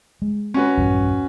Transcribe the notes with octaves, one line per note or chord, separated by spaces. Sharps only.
G#3
C#4 F#4 B4
A#1 E2 G2